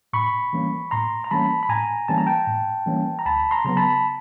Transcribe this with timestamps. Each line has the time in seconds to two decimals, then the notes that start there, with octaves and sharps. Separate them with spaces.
0.13 A2 B5 C#6
0.53 E3 G3 A#3 C#4
0.91 A2 A#5 C6
1.24 A#5
1.31 E3 G3 A#3 C#4 A5 B5
1.63 B5
1.69 A2 G#5 A#5
2.08 E3 G3 A#3 C#4 A5
2.18 A#5
2.27 G5 A5
2.47 A2
2.86 E3 G3 A#3 C#4
3.19 A#5
3.25 D2 A5 B5
3.51 A#5 C6
3.65 C#3 F#3 B3 A#5
3.77 A5 B5